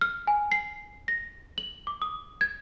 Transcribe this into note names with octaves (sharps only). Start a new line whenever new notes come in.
F6
G#5
C7
A#6
F#7
D6
D#6
G#6